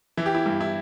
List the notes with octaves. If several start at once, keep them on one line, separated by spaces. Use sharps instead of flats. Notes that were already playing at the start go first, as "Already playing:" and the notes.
E3 E4
G4
E4
G2
E4